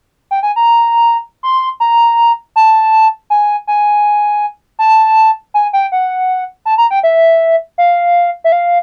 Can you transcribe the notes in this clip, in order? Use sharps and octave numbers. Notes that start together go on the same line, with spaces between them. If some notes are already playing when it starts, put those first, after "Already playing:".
G5
G#5
A#5
C6
A#5
A5
G#5
G#5
A5
G#5
G5
F#5
A5
A#5
G5
E5
F5
E5
F5